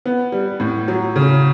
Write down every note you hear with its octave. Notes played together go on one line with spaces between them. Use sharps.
B3
G3
A2
F#3
C#3